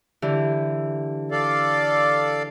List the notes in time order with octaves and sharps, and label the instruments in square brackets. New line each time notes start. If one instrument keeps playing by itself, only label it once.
[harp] D3 E3 G4
[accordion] A4 D5 F5